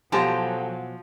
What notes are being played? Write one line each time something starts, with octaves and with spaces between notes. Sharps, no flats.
B2 F3 F#3 G4 A4 C5 G#5 A#5